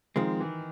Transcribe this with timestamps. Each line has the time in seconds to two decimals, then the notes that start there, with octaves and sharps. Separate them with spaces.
0.16 D#3 F3 G#3 C4
0.40 E3